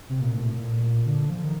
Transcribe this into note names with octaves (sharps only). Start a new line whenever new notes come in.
C3
A#2
A2
A2
A#2
D3
F3
D#3